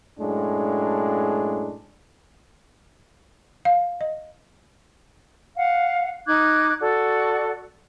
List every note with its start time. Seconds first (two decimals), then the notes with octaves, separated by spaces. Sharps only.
0.19 F#2 A2 G#3 D4
3.65 F5
4.01 D#5
5.57 F5 F#5
6.27 D#4 D6 F#6 G#6
6.80 F#4 A4 D5